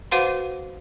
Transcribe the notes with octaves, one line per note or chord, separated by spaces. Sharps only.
F#4 B4 C5 F5 F#5 C6